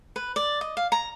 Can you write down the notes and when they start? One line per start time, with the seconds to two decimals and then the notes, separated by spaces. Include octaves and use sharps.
0.16 B4
0.36 D5
0.61 D#5
0.77 F5
0.92 A#5